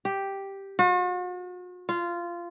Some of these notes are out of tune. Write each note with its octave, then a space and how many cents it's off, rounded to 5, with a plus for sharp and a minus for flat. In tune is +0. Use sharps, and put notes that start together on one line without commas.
G4 +0
F#4 -45
F4 -15